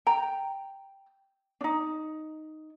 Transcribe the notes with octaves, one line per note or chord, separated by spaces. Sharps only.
G5 A#5
D4 D#4